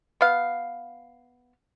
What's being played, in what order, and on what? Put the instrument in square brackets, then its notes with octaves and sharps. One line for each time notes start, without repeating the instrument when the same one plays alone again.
[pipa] B3 F5